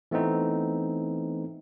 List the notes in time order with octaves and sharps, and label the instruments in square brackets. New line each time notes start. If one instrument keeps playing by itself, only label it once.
[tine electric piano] E3 A3 B3 C4 D#4